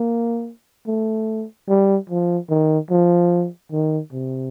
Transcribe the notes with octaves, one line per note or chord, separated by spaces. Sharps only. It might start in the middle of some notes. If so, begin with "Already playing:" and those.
Already playing: A#3
A3
G3
F3
D#3
F3
D#3
C3